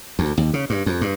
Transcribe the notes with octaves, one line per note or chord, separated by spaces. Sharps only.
D2
D#2
C#3
G2
F2
G2